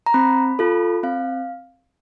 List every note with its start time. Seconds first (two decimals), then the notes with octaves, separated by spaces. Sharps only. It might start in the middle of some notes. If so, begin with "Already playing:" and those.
0.06 A#5
0.14 C4 B5
0.59 F4 A4
1.03 C4 F5